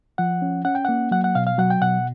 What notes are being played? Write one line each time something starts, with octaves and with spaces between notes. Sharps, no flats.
F3 F#5
C#4
C#4 F#5
G5
A#3 F#5
F#3 F#5
F#5
B2 F5
F5
F#3 F#5
G5
B2 F#5